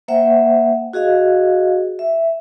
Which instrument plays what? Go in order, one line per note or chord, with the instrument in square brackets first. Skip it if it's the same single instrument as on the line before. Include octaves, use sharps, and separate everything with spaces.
[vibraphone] A#3 C5 E5 F#5 G5
F#4 G#4 D#5 F5
E5